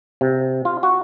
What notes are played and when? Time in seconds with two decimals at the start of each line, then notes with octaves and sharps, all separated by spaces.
0.21 C3
0.65 F4
0.83 F#4